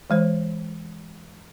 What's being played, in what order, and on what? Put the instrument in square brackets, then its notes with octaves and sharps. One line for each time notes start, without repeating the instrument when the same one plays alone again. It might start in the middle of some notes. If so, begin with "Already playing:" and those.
[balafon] E3 G#3 C5